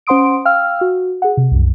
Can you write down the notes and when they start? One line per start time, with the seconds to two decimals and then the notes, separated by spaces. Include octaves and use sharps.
0.07 C#4 C5 F#5 C6 D#6 D7
0.45 F5 G5 E6 F6
0.81 F#4
1.22 G#4 F#5
1.37 C3
1.52 C2 F#2